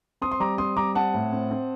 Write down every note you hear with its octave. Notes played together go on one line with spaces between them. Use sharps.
C4 C6 D#6
C6
G3 A#5 D6
C4 C6 D#6
G3 A#5 D6
C4 F#5 A5
A2
C4
C4